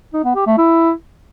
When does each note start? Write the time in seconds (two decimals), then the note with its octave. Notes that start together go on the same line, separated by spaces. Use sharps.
0.13 D#4
0.25 B3
0.36 G4
0.47 A3
0.58 E4